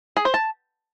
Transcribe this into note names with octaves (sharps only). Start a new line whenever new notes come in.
G#4
C5
A5